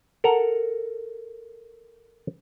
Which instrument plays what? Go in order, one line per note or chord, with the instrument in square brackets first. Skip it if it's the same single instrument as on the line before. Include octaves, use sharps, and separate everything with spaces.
[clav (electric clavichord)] A4 A#4 F#5 A#5